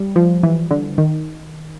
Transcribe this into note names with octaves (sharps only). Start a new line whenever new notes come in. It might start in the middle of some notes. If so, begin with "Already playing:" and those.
Already playing: G3
F3
E3
D3
D#3